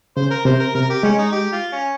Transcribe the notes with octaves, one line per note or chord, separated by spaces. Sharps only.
C#3 C5
A#4
C3 C5
A#4
C3 A#4
G4
G#3 C#4
D#4
G4
F4
C#4